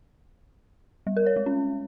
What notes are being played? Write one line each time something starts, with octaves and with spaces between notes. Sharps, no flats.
G3
A#4
C#5
G#3
C#4